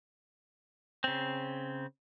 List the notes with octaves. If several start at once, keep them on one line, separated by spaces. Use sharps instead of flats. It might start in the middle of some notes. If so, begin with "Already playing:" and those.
C#3 C4